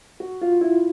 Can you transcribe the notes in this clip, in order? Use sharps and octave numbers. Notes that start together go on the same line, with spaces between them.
F#4
F4
E4